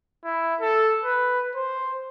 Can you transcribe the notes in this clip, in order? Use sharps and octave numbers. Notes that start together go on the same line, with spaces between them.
E4
A4
B4
C5